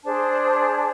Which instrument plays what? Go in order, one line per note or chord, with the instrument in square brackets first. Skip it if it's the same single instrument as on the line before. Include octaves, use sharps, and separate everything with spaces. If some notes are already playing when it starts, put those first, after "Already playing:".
[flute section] D4 G#4 C5 A5